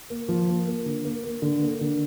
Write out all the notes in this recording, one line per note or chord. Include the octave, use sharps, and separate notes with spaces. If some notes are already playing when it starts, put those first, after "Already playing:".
A#3
F3
A#3
A#3
D3
A#3
A#3
D3
A#3
D3